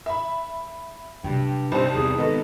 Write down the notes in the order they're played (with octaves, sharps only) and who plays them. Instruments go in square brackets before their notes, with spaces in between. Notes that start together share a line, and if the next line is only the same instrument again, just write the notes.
[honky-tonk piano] E5 B5
[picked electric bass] G2 [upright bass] C3 F#3 [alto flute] G5
[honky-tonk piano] C2 D#4 A5 [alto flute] C4
[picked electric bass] E2 E3 [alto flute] G#4
[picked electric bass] G#2 D#3 [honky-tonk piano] B3 A4 [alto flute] D#5